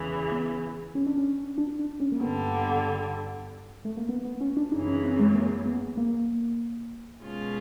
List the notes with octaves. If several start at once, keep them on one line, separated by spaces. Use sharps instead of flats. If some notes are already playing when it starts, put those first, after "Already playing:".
Already playing: E2 C#3 E3
B3
C#4
D4
C#4
D4
D4
C#4
A#3
G2 D3 G3 B3
A3
A#3
B3
B3
C#4
D4
F#2 C#3 E3 D#4
C#4
C4
G#3
A#3
B3
A#3
B2 G#3 C#4 F4